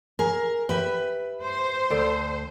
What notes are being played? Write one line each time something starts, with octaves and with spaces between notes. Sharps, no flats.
G#4 A#4
G4 B4 E5
C5
D2 A4 D5